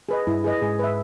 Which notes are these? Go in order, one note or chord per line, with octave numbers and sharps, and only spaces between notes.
G#4 B4 D#5
G2 G3 E4
G#4 B4 D#5
G#2 G#3 G#4
B4 E5